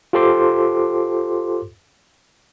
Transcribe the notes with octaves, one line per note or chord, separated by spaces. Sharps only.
F4 G4 A4 C5 C6 D6